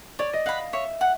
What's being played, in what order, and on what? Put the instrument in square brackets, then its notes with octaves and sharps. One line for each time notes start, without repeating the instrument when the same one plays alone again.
[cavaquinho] C#5 [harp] D5
[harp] D#5
[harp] F5 [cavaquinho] F#5 B5
[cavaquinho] C#5 [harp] E5
[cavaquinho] F#5